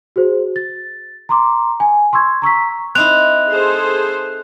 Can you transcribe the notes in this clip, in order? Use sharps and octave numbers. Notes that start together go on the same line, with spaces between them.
F#4 G#4 C5
A6
A#5 C6 D6
G#5
C6 C#6 E6 G#6
A#5 C#6 E6 B6
C4 D#4 E4 F#6 F7
G#4 A4 C5